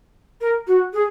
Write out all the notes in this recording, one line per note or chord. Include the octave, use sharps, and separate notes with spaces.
A#4
F#4
G#4